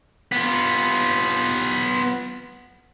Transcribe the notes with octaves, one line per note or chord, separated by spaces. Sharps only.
B3 F4